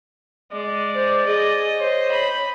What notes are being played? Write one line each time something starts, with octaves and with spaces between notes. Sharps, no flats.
G#3 D5
C5
G#4 D#5
C5 C#5
B5